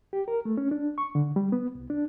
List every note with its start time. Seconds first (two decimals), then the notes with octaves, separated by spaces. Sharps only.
0.13 G4
0.28 A#4
0.45 A3
0.57 C#4
0.71 D4
0.98 C#6
1.15 D3
1.36 G3
1.52 B3
1.75 C2
1.90 D4